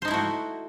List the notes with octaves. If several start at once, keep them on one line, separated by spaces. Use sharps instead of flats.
A3 D#4 E4 F#4 C5